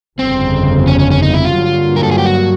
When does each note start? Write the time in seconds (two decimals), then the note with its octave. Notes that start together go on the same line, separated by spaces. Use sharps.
0.18 G1 F2 C#3 C4
0.87 C#4
0.99 C#4
1.11 C#4
1.22 D#4
1.34 E4
1.45 F4
1.57 G2 D3 F#3 A#3
1.96 A#4
2.03 A4
2.11 G#4
2.18 G4
2.26 F#4